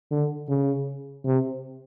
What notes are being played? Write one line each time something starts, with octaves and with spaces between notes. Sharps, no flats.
D3
C#3
C3